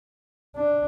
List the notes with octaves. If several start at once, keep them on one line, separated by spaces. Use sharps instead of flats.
D4